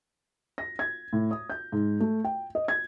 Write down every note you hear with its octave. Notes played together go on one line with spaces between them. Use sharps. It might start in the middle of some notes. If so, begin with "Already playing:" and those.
A#6
G#6
A2
D#6
G6
G#2
A3
G5
D#5
G#6